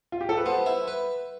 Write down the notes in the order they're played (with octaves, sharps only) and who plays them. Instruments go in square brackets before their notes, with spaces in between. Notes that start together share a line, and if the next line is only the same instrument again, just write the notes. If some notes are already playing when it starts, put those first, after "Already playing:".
[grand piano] F4
G4
A4
B4
[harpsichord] B3 [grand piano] C5
[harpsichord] E4
B4